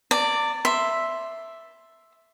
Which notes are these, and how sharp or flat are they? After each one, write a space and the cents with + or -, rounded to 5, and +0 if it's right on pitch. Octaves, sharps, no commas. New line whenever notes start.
D5 +0 A#5 -45
E5 +0 C6 +0